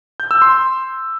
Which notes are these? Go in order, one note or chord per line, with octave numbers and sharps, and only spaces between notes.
G6
E6
C6